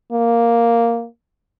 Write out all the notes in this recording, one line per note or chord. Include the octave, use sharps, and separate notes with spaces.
A#3